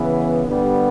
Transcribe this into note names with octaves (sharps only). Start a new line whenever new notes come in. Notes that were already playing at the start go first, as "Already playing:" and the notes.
Already playing: C#3 E3 B3
G2 D3 G3 B3